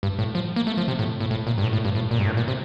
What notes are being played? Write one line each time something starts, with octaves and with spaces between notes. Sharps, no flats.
G2
A2
F3
A#3
A3
F3
C3
A2
A2
A2
A#2
G2
A2
A2
G2
A2
A#2
G2
A2
A#2
C3